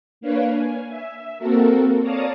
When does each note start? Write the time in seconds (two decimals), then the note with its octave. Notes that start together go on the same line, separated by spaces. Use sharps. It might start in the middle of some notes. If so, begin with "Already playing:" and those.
0.21 A#3 D4 B4 C#5 F5
0.52 G#5
0.88 E5
1.38 A#3 C4 F#4 A4 A#4
2.01 C#5 D5 F5 A5 A#5 D#6